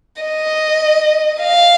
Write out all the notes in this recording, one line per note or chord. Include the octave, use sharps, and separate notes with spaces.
D#5
F5